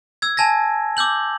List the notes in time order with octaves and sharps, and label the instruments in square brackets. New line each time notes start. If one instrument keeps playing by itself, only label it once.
[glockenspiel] E6 G#6
G#5 A5 G#6 A#6
D6 E6 G6 F#7